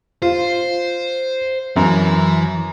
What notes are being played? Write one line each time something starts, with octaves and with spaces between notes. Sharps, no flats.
F4 C5
F#2 E3